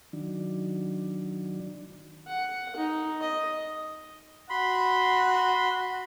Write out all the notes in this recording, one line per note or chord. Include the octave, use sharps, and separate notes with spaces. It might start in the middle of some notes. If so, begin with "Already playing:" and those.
D#3 F#3 D4
F#5
D#4
D#5
F#4 B5 C6